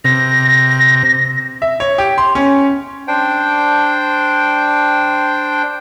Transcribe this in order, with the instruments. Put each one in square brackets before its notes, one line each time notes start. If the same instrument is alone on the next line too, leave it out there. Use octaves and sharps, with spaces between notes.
[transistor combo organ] C3 [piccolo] A#6
[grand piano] E5
C#5
G4
C6
C#4
[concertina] D4 C5 G5